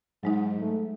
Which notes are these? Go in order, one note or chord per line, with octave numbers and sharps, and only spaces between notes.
G#2 F#3 G#3 D#4
A3